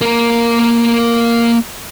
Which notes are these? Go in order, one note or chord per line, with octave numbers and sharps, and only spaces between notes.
A#3 A#4